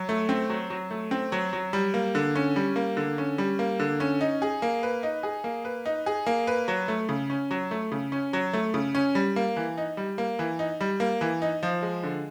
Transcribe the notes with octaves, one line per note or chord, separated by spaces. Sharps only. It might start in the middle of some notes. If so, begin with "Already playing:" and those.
Already playing: F#3
A3
C4
F#3
F#3
A3
C4
F#3
F#3
G3
A#3
D3
C#4
G3
A#3
D3
C#4
G3
A#3
D3
C#4
D#4
G#4
A#3
B4
D#4
G#4
A#3
B4
D#4
G#4
A#3
B4
F#3
A3
C#3
C#4
F#3
A3
C#3
C#4
F#3
A3
C#3
C#4
G3
A#3
E3
D#4
G3
A#3
E3
D#4
G3
A#3
E3
D#4
F3
G#3
D3